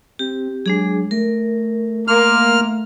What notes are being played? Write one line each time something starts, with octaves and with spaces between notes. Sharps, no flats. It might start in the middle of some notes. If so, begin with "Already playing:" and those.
C4 G4
F#3 G#3 D4 G#4
A3 A#4
A#3 C6 F6